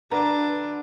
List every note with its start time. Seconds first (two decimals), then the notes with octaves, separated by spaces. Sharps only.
0.11 D2 D4 B4 A#5